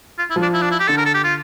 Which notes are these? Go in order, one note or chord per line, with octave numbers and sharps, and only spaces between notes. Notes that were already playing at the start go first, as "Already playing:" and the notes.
F4
E4
F3
D4
E4
D4
E4
G4
D3 A4
A#4
A4
G4
F4